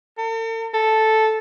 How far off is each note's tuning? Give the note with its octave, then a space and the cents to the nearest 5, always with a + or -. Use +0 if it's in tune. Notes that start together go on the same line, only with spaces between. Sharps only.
A4 +45
A4 -5